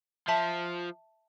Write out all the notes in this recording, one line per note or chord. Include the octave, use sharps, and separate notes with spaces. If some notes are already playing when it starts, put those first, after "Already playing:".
F3 E5 A5 B6